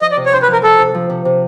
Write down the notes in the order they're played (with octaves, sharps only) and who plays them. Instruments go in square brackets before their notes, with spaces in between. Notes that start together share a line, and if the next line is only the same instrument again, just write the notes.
[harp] F3 [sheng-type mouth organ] D#5
[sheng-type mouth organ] D5
[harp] C3
[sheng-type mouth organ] C#5
[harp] D4 [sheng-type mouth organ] C5
[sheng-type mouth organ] B4
[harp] F3 [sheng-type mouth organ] A#4
[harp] F3 [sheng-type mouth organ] A4
[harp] C3
F3
C3
C3